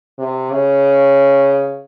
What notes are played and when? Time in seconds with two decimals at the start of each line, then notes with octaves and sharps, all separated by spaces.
0.19 C3
0.51 C#3